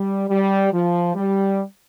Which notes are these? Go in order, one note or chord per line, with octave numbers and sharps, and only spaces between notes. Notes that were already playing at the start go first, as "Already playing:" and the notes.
Already playing: G3
G3
F3
G3